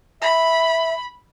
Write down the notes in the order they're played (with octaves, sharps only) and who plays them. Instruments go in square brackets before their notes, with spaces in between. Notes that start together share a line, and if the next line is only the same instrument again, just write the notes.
[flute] E5 [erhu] B5